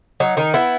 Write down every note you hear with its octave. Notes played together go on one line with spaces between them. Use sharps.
F#3 D#4
D#3 D#4
B3 E4